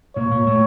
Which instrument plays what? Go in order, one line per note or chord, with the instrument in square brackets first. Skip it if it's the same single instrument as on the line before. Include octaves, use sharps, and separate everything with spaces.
[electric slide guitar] A#2 A#3 [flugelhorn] C#5
[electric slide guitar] A#2 A#3
A2 A3